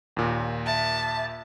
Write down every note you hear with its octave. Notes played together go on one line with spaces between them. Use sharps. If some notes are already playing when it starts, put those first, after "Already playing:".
D#2 A#2
E5 A5